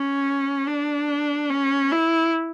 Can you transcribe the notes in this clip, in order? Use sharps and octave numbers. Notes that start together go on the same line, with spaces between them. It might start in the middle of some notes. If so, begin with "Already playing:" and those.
Already playing: C#4
D4
C#4
E4